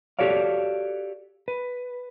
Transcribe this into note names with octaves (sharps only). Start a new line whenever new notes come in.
F#4 G4 A4 C#5 D5 F5
B4